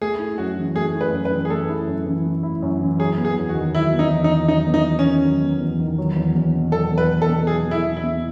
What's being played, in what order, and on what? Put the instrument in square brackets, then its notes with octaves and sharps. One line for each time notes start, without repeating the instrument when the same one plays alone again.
[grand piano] A3 [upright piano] G#4
[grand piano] E4
[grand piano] F#2 [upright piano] F#4
[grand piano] E3
[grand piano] A3 [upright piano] G#4
[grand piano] E4
[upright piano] B4
[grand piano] F#2
[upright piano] B4
[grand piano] E3
[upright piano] G#4
[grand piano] A3 [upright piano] A4
[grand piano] E4
F#2
E3
A3
E4
F#2
E3
[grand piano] F#3 [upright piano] G#4
[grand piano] B3
[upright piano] G#4
[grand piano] E2
[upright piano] F#4
[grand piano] D#3
[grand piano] F#3 [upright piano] E4
[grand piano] B3
[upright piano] D#4
[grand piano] E2
[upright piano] D#4
[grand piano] D#3
[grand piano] F#3 [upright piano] D#4
[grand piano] B3
[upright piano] D#4
[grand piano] E2
[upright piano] C#4
[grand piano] D#3
F#3
B3
E2
D#3
F#3
E2
E2
B2
[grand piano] F#3 [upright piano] A4
[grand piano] E2
[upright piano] B4
[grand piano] E2
[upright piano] A4
[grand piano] B2
[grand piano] F#3 [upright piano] G#4
[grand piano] E2
[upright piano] E4
[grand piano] E2
[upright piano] E4
[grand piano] B2